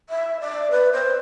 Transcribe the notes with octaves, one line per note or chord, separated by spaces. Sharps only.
E5
D5
B4
C5